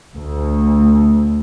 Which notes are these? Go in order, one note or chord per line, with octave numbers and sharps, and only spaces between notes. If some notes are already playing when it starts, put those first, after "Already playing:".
D2